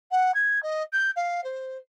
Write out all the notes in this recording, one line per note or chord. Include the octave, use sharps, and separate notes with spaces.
F#5
G#6
D#5
G6
F5
C5